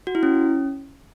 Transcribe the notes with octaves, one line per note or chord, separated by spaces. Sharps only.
F#4
E4
C#4